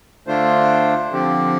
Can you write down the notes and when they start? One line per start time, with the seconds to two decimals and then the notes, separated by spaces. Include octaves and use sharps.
0.27 D3 A3 D4 F4 C5
1.11 D3 F3 C4 G4